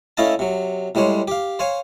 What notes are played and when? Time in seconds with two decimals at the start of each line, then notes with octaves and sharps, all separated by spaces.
0.17 A3 C#4 E4 D#5 F5 A5
0.39 C3 F#3
0.95 A2 G3 G#3 C5 C#5
1.28 G4 F5
1.59 C5 C#5 F5 G#5